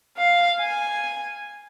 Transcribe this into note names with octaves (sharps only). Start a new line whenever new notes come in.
F5
G#5